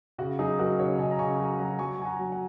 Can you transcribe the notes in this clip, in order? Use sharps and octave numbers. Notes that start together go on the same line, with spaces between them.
C#3 F#4
F#3 D#4 G#4
F#3 F#4 A#4
C#3 C#5 F#5
C#3 D#5 G#5
A#5
C#3 G#5 C#6
F#3 F#5 A#5
F#3 F#5 A#5
F#3 G#5 C#6
F#3 G#5
F#5 A#5
F#3
F#5 A#5